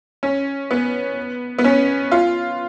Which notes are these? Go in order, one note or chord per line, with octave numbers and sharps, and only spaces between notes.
C#4
B3
B3
C#4
F4